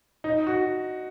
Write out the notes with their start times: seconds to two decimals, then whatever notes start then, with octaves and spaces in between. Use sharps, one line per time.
0.24 D#4
0.47 F#4